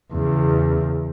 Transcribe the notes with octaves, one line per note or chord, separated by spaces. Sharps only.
E2 C#3